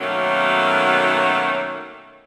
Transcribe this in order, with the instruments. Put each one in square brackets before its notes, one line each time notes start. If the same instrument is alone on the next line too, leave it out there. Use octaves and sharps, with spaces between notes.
[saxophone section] B2 D#3 F#3 A3 A#3 C#4